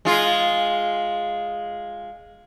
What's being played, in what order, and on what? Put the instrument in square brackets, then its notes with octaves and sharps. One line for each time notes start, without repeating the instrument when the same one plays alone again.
[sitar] G#3 F4